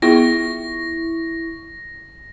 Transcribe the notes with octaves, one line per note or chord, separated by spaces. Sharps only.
B3 E4 F4 G#4 C#6 A#6